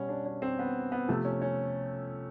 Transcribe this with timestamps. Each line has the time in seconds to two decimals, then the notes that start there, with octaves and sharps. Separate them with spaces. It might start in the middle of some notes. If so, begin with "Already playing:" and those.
Already playing: B2 G3 C#4
0.09 D4
0.26 C#4
0.42 C4
0.59 B3
0.92 B3
1.08 C3 F3 A3
1.25 C#4
1.42 C#4